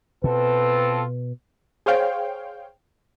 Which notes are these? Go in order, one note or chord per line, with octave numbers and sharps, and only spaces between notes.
B2 C4 F4 A4 B4
G#4 C5 C#5 F5 G5